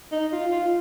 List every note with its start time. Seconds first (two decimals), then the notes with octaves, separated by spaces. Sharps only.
0.12 D#4
0.32 F4
0.51 F4